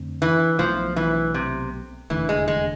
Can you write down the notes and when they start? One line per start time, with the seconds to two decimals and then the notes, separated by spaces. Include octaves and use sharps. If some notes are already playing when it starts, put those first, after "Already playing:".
Already playing: F2 D3 A3 C4
0.22 E3
0.59 B1 B2 F3 A3
0.96 E3
1.34 C3
2.10 F1 E2 D3 E3 A3
2.29 G#3
2.48 G#3